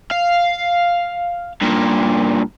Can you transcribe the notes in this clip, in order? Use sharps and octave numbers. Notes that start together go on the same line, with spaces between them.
F5
G2 A#2